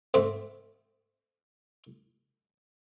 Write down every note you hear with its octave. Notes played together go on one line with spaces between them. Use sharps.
G#2 A3 C4